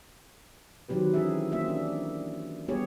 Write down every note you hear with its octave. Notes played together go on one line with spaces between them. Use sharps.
D#3 F#3 C4 G4 B4
E3 C#4 G#4 E5
A#3 C4 E5
D4
G3 B3 G4 G#4 C#5